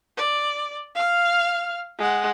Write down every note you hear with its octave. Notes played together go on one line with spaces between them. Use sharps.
D5
F5 F6
G#3 F#5